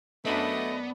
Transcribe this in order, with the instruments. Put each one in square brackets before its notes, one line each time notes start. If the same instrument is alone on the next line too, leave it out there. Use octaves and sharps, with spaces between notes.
[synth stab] F#2 D4 B5 [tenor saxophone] A3 [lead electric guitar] B3 [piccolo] D#5